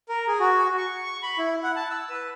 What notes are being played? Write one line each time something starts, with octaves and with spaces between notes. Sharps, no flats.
A#4
G#4
F#4
C#6
C#6
B5
E4
F#5
A5
E6
B4